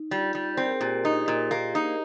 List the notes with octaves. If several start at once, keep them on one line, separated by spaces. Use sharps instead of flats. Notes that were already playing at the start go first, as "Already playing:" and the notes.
Already playing: D#4
G3 F4
G3 D#4
D5
C4 C5
A#4
G#4
A#2 G4
D#4 D#5
A#2
A#3
D#4